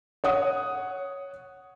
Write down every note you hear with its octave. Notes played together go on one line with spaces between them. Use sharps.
C#5 F#5 D#6